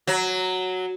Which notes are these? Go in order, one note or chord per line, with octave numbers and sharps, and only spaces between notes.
F#3